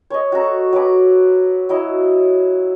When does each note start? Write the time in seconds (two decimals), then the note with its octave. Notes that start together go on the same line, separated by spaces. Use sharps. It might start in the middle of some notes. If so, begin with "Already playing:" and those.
0.10 C#5 D#5
0.32 F#4 A4 A#5
0.73 F#3 F#4 B4 D6
1.69 F#3 E4 D#5